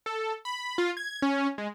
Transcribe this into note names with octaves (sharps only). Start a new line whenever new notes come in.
A4
B5
F4
G#6
C#4
G#3